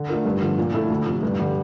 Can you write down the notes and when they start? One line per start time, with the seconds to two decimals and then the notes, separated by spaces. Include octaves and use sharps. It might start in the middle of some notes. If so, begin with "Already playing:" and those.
Already playing: D3
0.09 A3 D4 F4 A#4
0.25 G2
0.42 D3 F3
0.58 A#2
0.74 A3 E4 A4
0.90 D2
1.06 C3 F3
1.23 G2
1.39 D3 G3